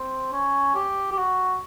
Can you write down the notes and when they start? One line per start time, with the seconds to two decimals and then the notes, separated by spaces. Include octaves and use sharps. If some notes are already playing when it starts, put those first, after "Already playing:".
Already playing: C4
0.32 C#4
0.75 G4
1.11 G4
1.18 F#4